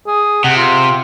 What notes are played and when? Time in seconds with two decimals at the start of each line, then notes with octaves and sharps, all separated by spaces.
0.07 G#4
0.44 C3 F#5
0.56 F4